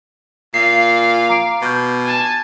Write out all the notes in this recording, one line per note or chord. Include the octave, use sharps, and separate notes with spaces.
A#2 F5 C7
A#5 D6 D7
B2 D6 F6 G6
G#5 A5